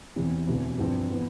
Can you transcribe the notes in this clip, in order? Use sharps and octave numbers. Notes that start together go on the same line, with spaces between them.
E2 C3 E3
E1 D2 C3 E3
G2 F3 C4
E3 B3